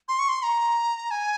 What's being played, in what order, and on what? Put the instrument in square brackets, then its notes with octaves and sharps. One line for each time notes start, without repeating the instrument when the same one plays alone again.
[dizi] C6
C#6
C6
A#5
G#5